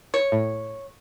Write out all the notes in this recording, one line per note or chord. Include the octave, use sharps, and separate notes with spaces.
C#5
A2